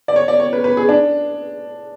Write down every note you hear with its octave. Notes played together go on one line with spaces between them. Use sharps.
D5
C#5
D5
C#5
B4
B4
G#4
D4